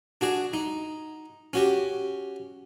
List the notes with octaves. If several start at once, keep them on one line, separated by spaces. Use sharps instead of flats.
D4 F#4 G#4
D#4
C#4 F#4 G4